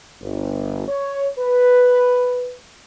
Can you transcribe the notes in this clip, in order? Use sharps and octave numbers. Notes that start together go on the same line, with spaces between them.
G1
C#5
B4